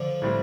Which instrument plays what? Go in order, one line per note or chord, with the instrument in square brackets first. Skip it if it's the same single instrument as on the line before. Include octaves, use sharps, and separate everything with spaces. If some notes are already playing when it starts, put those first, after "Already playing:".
Already playing: [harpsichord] D3 F3
[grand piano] A2 G3 C4